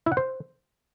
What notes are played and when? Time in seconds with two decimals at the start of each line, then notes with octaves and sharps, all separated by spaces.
0.06 E4
0.12 F#5
0.17 C5